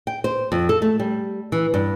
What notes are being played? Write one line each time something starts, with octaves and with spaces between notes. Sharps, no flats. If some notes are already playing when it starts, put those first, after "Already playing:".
G5
C5
F2
A4
A3
G3
E3
G2